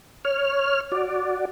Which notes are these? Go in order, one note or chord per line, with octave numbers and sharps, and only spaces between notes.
C#5 F6
F#4 D5